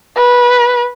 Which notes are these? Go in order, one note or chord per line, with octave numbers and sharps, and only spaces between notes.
B4